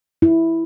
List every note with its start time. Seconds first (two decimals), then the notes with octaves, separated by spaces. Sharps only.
0.22 E4